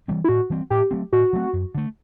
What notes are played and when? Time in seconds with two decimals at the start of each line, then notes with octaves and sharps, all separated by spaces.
0.08 E3 G3 C4
0.24 E4
0.29 A2 F#4
0.50 E3 G3 C4
0.70 A2 G4
0.91 F#3 A3 C4
1.12 A2 F#4
1.33 F#3 A3 C4
1.53 F#2
1.75 D3 A3